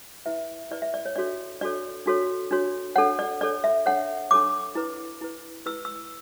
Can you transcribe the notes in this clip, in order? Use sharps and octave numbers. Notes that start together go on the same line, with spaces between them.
E4 B4 E5
E4 B4 D5
E5
D5
C#5
D4 F#4 A4 C#5 D5
D4 F#4 A4 C#5 D5
D4 F#4 A4 C#5
D4 F#4 A4 C#5
D4 A4 C#5 F#5
D5
D4 A4 C#5 D5
E5
D4 A4 C#5 F#5
D4 A4 C#5 D6
E4 B4
E4 B4
E4 B4 E6
E6